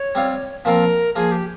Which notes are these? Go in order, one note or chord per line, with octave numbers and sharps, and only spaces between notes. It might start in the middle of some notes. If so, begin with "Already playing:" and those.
Already playing: C#5
G3 C4 F4
A#2 F3 C4 F4 A#4
F3 A#3 F4 G#4
G4